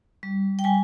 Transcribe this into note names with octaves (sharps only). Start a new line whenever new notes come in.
G3
G5
G3 G#5